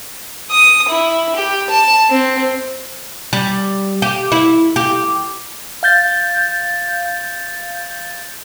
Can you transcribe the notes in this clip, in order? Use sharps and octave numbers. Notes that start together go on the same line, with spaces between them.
D#6
E4
G4
A5
C4
G3
G4
E4
G4
F5 G6 A6